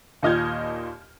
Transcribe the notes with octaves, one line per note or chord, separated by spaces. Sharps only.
D#2 A#2 D#5 F6 G6 G#6